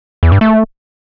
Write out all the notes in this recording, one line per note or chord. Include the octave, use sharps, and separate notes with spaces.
E2
G2
A3